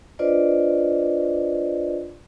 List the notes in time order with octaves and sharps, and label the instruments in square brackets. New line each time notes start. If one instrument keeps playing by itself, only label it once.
[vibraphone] D4 F4 B4 C5 D5 D#5